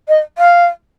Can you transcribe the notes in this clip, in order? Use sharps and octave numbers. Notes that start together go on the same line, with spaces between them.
D#5
F5